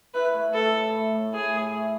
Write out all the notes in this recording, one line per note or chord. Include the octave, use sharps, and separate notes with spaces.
E4 B4
A3
E4 A4
A2
A3
A2
A2 G#4
A2
A3